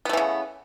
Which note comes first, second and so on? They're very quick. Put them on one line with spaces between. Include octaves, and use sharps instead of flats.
B3 A3 E3 C#3